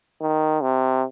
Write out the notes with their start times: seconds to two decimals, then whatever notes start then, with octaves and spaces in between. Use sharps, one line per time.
0.21 D#3
0.61 C3